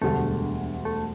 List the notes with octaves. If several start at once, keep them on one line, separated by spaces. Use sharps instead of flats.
E1 D2 D3 G3 A3
A3